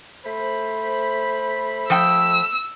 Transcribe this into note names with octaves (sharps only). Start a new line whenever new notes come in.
A3 C5 B5
F3 G5 E6